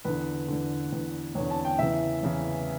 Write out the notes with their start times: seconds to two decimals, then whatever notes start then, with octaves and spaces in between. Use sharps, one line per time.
0.05 E2 D3 B4
0.48 E2 D3
0.92 E2 D3
1.35 E2 C#5
1.40 D3
1.51 A5
1.65 G5
1.79 E2 C#3 E3 E5
2.23 E2 C#3 E3